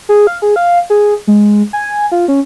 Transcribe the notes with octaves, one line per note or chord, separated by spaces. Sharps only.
G#4
F5
G#4
F5
G#4
G#3
G#5
F4
C#4